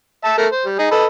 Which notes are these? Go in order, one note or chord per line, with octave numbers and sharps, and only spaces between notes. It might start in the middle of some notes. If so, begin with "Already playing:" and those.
E5 A5
A3 A#4
C5
G3
D#4 G#4
A4 B4 D#5